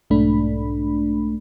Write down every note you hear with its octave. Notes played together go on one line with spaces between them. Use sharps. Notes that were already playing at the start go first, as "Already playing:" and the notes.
B1 G#2 A3 D4 B5